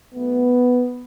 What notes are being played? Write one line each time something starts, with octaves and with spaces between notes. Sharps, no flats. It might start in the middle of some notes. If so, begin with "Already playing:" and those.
B1 B2 A3 B3